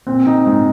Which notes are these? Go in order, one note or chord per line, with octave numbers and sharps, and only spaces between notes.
A#2 C4
D#4
G#2 D#4